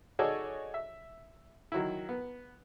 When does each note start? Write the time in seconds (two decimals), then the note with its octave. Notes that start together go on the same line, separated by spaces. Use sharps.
0.19 D#4 F#4 G#4 A4 C#5 D5
0.74 E5
1.72 D#3 F#3 E4
2.09 B3